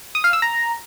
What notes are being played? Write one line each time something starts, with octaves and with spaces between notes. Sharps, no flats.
D#6
F5
E6
A#5